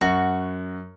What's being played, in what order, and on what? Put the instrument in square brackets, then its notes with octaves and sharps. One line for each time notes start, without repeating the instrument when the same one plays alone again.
[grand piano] F#2 [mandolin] F#4